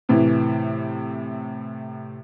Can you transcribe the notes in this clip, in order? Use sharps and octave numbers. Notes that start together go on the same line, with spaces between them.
A2 C3 E3